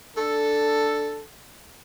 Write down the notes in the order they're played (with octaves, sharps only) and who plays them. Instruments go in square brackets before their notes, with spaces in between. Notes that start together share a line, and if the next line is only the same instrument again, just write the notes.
[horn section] D4 A4